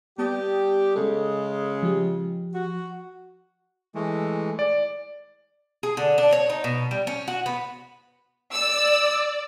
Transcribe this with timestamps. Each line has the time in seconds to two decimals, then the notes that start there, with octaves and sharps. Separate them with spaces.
0.18 G3 B3 G4 A5 D#6
0.96 C#3 G#3 A4
1.83 F3 G4
2.54 F#4
3.95 E3 G#3 A3
4.59 D5
5.83 G#4
5.97 D3
6.18 D4
6.33 C#5
6.50 D#4
6.64 B2
6.91 G3
7.07 C#4
7.28 F#4
7.46 B3
8.53 D5 E6